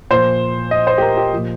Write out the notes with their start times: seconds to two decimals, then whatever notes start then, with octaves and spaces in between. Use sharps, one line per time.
0.11 A#2 F3 C5
0.71 D#5
0.87 C5
0.98 G4
1.02 A#4
1.17 G4
1.32 A#2 F3